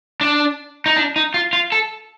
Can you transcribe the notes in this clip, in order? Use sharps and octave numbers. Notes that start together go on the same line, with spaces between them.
D4
D#4
D4
D#4
F4
F4
A4